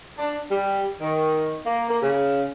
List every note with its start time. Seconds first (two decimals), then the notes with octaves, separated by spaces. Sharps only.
0.18 D4
0.51 G3
1.01 D#3
1.65 A#3
1.89 A#3
2.02 C#3